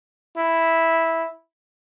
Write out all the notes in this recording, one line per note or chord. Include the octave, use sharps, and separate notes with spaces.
E4